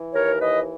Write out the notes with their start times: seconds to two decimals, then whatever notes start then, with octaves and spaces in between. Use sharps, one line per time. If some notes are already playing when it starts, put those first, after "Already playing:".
Already playing: E3
0.14 D#2 A#4 C#5
0.40 E3 B4 D#5